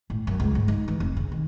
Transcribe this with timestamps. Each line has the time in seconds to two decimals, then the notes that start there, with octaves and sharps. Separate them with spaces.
0.10 A2
0.27 F#2
0.40 C#2
0.55 G#2
0.68 D#4
0.88 E3
1.00 F1
1.17 C#3
1.32 D#3